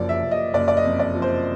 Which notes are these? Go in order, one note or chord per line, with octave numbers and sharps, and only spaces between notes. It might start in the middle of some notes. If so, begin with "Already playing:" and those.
Already playing: F#1 F3 D5
E5
F#1
D#5
F#1 D5
D5
D#5
F2
D5
F3
C5